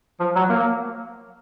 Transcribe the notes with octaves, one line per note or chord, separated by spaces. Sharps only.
F3
F#3
A#3